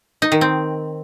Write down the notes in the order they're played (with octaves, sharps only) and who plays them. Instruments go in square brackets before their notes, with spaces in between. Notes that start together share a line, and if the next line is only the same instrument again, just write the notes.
[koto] D#4
D#3
C4